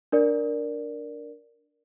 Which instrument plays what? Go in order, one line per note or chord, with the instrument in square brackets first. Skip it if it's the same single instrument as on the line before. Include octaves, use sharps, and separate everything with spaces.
[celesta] D4 A#4 D5